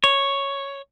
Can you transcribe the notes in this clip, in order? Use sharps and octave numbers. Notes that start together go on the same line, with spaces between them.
C#5